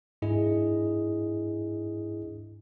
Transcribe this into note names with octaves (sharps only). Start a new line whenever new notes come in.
G#2 D4 E4 G#4 D#5